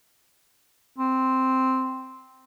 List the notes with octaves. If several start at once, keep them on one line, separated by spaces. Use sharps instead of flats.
C4